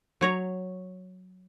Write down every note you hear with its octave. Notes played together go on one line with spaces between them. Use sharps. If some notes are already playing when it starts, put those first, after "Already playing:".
F#3 C#5 A#5